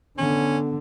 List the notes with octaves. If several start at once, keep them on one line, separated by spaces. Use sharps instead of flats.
D3 B3 C#4